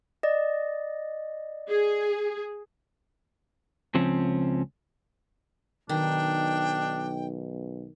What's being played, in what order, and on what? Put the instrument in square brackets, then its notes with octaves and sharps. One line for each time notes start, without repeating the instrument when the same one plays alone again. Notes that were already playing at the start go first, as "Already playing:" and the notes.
[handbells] D5 D#5
[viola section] G#4
[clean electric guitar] C#2 F3 C4 C#4
[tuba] B1 [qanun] D#3 [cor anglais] D4 [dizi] G5